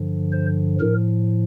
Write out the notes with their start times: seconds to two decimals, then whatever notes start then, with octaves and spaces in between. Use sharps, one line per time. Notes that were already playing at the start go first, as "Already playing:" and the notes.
Already playing: G2 D3 F3
0.32 C5
0.80 A2 F3 A#4